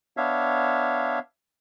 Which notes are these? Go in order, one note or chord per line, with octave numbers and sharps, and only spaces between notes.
B3 D4 C#5 E5 F5